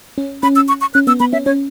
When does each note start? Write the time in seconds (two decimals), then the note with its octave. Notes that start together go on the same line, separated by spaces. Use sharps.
0.18 C#4
0.43 C#4 B5
0.56 E6
0.68 C#6
0.81 C#6
0.94 C#4 F#6
1.07 B3 E6
1.20 B3 B5
1.33 C#4 E5
1.46 C#4 C#5